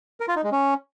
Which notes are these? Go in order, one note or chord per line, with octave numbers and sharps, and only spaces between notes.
A#4
F4
D#4
G#3
C#4